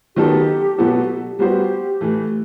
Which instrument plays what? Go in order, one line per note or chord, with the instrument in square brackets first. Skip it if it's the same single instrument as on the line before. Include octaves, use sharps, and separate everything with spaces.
[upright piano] D#3 F#3 B3 D#4 A4 [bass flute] G4
[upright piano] B2 F#3 B3 F#4 A4
[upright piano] G3 B3 F#4 C5 [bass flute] G4
[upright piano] A2 E3 A3